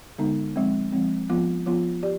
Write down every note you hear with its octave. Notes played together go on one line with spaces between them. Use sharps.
D3 G#3 B3 D#4
F3 G#3 C4
F3 G#3 C4
F3 B3 F4
F3 B3 F4
G4 D5